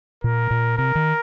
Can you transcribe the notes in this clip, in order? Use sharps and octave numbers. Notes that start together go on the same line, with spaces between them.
A#2 A#4
A#2
C3 A#4
D#3